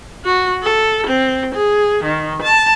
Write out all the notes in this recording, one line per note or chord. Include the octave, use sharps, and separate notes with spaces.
F#4
A4
C4
G#4
D#3
A5